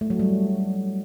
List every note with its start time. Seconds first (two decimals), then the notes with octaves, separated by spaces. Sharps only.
0.01 A3
0.10 F#3
0.19 G3